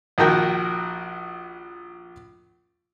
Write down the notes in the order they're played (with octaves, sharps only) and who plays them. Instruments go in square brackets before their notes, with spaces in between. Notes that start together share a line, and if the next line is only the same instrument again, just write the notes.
[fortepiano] A#1 D#3 F#4 A#4 G5